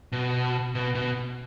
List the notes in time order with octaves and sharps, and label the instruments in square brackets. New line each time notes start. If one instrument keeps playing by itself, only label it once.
[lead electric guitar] B2
B2
B2